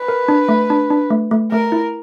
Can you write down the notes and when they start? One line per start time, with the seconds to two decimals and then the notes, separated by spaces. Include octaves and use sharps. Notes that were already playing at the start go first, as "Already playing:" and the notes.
Already playing: B4
0.08 A#4
0.28 D4
0.49 A3
0.70 D4
0.90 D4
1.10 A3
1.31 A3
1.52 A3 A#4
1.72 E4